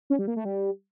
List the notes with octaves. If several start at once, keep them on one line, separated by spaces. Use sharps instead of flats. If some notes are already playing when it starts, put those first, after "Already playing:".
C#4
G3
A#3
A3
G3